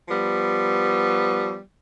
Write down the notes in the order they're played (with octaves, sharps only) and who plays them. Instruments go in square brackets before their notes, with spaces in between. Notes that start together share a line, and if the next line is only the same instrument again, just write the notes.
[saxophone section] F3 G3 B3